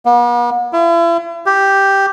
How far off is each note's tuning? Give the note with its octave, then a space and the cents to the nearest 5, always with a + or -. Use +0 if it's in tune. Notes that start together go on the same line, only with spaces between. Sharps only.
B3 -45
E4 +40
G4 +0